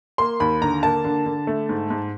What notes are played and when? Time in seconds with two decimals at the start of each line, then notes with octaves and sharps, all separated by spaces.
0.18 A#3 C6
0.40 D#2 B5
0.62 D3 A#5
0.83 A#3 A5
1.04 D3
1.26 D3
1.47 A3
1.69 G#2
1.90 G#2